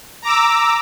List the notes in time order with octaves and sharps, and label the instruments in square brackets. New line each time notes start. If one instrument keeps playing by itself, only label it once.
[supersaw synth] A#5 D6 E6